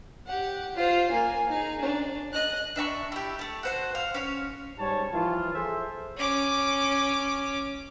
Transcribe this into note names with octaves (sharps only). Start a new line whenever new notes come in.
G4 F#5
F4 C5
A#3 G#5
D#4 G#4
D4
D#5 F#6
D4 E5 A5 C#6
E4 G4
A3 A5
F#4 C5 F#5
F5 C6
C#4 C#5
G#2 G3 C#5 A5
E3 F3 F4
G#4 A4 C5 E5
C#4 D6